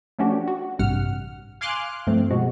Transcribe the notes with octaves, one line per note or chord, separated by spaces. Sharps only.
F3 A3 C#4 D4 F#4 G4
F#4
A1 G2 C3 F#5 F6
F5 G#5 C6 D6 F6 F#6
G2 F3 A3 C4
B2 F3 G#3 F#4